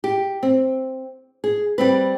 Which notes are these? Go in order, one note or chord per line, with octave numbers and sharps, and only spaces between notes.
G4
C4
G#4
G3 C4 B4